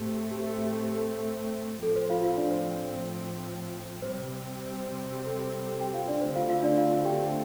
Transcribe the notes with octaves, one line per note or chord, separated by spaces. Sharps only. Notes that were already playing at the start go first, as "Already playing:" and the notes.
Already playing: A2 A3 C4 G4
A4
G4
A4
G4
A4
C5
A4
A2 F3 C4 A4
C5
F4 F5
F4 F5
D4 D5
C5
C5
C3 G3 C4 C5
G4
A4
G4
A4
G4 G5
F4 F5
D4 D5
D3 A3 C4 C5
F4 F5
F4 F5
D4 D5
F4 F5
F4 F5
G4 G5